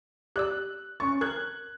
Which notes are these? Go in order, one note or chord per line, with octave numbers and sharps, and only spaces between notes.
G4 D5 E6 F#6
C#4 C#6 A6
A#4 F#6 G#6